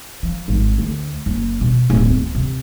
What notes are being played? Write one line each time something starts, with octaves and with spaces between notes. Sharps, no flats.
F3
G#1
D2
F#1
B2
D1
B3
C3